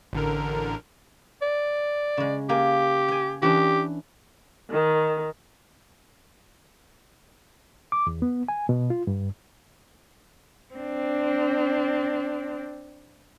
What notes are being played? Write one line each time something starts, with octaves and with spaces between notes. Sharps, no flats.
A1 D3 A#4
D5
C#3 G#3
A#3 G4 F5 G#5
G5 G#5
E3 C#4 D4 G4
D#3
D6
E2
B3
G#5
B2
F4
G2
C4 D4